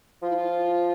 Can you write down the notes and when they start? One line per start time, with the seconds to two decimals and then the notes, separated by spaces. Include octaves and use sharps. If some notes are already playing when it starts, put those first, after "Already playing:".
0.22 F3 F4
0.30 E4
0.37 F4